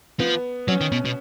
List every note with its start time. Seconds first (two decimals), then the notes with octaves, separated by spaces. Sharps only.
0.20 F3 B3
0.68 F#3 C#4
0.81 D#3
0.92 B2
1.05 B2